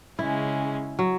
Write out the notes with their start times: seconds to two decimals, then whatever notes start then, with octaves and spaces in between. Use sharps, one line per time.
0.19 C#3 G#3 C#4 E4
0.99 F#3